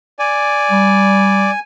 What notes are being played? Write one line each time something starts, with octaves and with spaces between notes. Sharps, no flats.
D5 G#5
G3